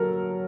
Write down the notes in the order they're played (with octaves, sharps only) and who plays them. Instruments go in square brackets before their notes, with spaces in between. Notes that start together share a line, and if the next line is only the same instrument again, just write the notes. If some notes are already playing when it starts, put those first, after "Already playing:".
Already playing: [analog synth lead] F#3 [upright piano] A4 A#4